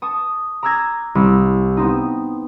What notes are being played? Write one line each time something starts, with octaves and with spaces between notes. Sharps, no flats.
A5 C#6 D#6
A#5 D6 E6 F#6 G#6 A#6
C2
B3 C4 D#4